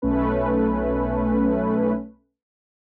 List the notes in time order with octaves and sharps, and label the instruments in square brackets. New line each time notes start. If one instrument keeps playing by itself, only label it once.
[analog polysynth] B1 A3 C#4 B4